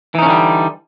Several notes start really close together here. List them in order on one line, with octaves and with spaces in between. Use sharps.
E3 D#4 C#4 D3 G3